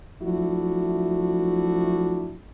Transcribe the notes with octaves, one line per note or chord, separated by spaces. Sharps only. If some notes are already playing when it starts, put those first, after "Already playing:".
F3 F#3 A3 D4 E4 F#4